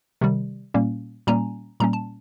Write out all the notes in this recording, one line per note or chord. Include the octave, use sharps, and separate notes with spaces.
C3 D#3 G3
A#2 G3 A#3 C#4
A#2 G3 A#3 C#4 G#5 A#5
A#2 G3 A#3 C#4 A#5
A5